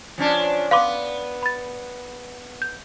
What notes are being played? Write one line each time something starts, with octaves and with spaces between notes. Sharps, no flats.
F3 C#4 D4
B3 B4 F5 C6 D6
B5 A6
G6